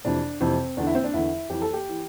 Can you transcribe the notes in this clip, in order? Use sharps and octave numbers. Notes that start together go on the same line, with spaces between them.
F2 C3 E3 D4
F2 C3 E3 C4
E2 D3 D4
E4
C4
D4
E2 D3 E4
F2 E3 G4
A4
G4
E3